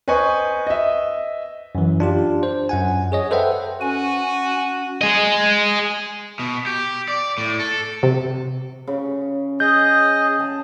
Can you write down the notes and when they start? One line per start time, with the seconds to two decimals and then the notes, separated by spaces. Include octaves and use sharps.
0.08 B4 C5 D#5 G#5 C#6
0.67 D#5 E5
1.75 F#2 E3
2.00 D4 F4 G4
2.43 C5
2.69 F#2 F#5 G#5
3.12 G#4 C#5 D#5
3.31 A4 B4 C5 E5 F#5 G5
3.81 C#4 F#4 G#5
5.01 G#4 D#5
6.39 B2
6.66 G4
7.08 D5
7.38 A2
7.60 A4
8.03 C3
8.87 C#3
9.60 G#4 D#5 G6
10.40 A5